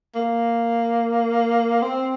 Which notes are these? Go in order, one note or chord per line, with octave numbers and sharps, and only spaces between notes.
A#3
C4